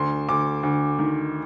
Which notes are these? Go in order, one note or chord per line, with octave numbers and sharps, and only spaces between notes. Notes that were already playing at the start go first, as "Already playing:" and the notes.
Already playing: D2 C6
D2 D6
D2
D#3